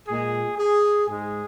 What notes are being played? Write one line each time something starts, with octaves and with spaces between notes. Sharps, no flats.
A#2 G#3 G#4
G#4
G#2 G#3 G#4